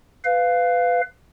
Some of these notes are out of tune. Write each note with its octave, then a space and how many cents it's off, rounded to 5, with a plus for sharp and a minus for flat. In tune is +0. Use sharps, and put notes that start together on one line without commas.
B4 +20 F5 +0